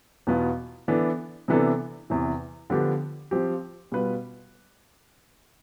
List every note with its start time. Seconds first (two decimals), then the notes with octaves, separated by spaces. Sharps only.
0.27 E2 B2 B3 F4
0.88 E3 B3 D4 A4
1.48 C3 E3 B3 D4 A4
2.10 E2 C3 E3
2.70 D3 F3 B3 D4 G4
3.31 F3 C4 G4
3.92 B2 G3 B3 F4 B4